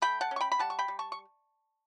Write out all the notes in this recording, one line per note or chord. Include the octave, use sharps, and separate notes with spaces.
A3 G5 B5
F#5 A5
C#4
C#6
G5 B5
B5
G3 F#5 A5
C#6
G5 B5
G3
A5 C#6
C#6